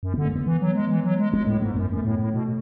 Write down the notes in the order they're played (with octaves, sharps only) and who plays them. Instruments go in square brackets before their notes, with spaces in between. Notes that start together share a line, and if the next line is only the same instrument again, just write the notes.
[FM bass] F#2
[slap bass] B3
[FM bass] D3
[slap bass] A3
B3
[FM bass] E3
F#3
G#3
E3
F#3
G#3
[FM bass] G#3 [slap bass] B3
[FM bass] A2 [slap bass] A3
[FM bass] G#2 [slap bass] A3
[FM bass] F#2 [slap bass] B3
[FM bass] F#2
[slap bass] A3
[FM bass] A2
A2
B2